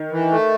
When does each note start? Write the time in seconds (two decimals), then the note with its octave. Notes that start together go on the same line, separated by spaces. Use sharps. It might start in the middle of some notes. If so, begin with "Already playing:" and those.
Already playing: D#3
0.11 E3
0.31 A3